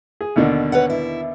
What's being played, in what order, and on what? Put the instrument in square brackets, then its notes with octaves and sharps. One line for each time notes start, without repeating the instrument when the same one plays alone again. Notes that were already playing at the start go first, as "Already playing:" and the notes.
[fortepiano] G#4
D#2 B2 D3
[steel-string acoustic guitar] B4 C#5 F#5
E4